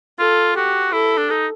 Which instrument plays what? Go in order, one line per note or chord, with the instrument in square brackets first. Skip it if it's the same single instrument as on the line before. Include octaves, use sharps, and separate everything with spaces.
[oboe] F4 [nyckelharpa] A4
[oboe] F#4 [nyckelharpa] G4
[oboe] E4 [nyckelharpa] A4
[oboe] D4
D#4